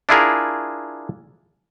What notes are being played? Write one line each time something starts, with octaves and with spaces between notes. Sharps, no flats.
D4 E4 F4 G#4 A#4